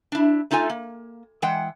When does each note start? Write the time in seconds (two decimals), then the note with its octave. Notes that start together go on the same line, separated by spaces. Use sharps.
0.12 D4 E4
0.51 A3 D#4 F4 A4 G#5
0.70 A#3
1.42 E3 G#3 F#5 G5